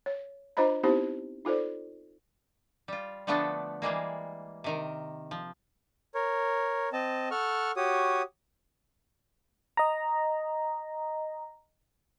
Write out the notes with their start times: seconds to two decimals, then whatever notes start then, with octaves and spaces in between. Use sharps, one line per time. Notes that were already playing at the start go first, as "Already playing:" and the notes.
0.06 C#5
0.57 D4 F4 C5 D#5 A#5 B5
0.83 B3 C4 D#4 E4 G4 C5
1.45 D#4 F4 A4 C5 D5
2.88 G3 F4
3.27 D3 F3 A3 B3 D4 A4
3.82 E3 G3 G#3 A#3
4.64 C3 D#3 A#4
5.31 F3
6.15 A#4 C#5
6.93 C4 D#5 A5
7.31 A4 F#5 C#6 F6
7.77 F#4 G4 C#5 D#6
9.77 D#5 A#5